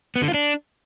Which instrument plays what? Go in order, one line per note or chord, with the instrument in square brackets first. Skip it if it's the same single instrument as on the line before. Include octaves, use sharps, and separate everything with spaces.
[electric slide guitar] B3
D3
F4
D4